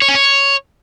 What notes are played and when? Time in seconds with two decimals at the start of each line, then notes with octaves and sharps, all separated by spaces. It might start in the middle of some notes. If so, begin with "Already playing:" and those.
0.02 C#5
0.08 C#4
0.15 C#5